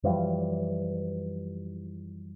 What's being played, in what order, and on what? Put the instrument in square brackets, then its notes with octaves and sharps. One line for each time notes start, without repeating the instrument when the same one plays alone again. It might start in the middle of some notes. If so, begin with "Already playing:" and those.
[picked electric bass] F#2 E3 F3 G3